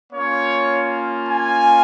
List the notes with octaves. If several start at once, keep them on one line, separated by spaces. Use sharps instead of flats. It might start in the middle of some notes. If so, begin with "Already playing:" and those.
A#3 C#4 F4 C#5
G#5